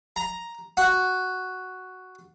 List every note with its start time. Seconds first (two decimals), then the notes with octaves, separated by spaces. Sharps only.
0.16 A#5
0.77 F#4